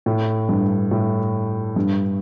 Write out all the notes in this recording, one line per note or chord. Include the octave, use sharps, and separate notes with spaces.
A2
G2
A2
G2